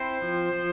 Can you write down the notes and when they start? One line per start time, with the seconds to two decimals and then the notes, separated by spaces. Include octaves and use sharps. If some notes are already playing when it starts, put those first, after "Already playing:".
Already playing: C4 E4 C5
0.22 F3
0.53 F3